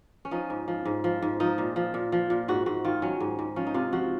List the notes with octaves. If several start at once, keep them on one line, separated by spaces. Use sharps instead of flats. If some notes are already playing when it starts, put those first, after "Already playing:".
C#4
F3 D#4
G#2
F3
G#2
F3
G#2
F3 D#4
A#2
F3
A#2
F3
A#2
G#2 F#4
G#2 F#4
D#3 F4
F#3 C#4
G#2
G#2
F3 C#4
D#4
C3 F4
F3 F#4